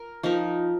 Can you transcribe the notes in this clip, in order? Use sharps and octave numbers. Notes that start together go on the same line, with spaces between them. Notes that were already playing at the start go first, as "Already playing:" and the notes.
Already playing: A#4
F3 D#4 A#4